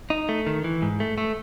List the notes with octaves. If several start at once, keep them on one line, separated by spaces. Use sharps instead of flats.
D#4
A3
D#3
E3
G#2
A3
A3